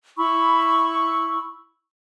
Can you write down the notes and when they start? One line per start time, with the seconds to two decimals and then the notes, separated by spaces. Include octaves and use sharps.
0.18 E4 B5 C#6 E6